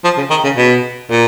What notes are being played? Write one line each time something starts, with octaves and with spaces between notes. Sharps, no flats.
F3
C#3
D#3
C#3
B2
A#2